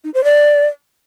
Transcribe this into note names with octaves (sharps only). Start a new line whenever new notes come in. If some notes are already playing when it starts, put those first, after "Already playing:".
D#4
C5
D5